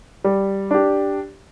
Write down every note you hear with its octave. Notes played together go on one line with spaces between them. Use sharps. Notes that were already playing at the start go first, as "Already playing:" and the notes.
G3
D4 G4